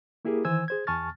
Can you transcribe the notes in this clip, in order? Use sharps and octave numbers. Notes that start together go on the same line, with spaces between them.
A#3 E4 G4 G#4 A#4
D#3 E3 C5 G#5 E6 G#6
G#4 C5 G#6
E2 G#5 A5 C#6 F6 A6